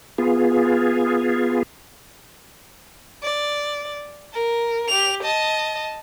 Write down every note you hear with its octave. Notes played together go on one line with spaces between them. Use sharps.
B3 F4 G#4
D5
A#4
G4 F7
D#5 A5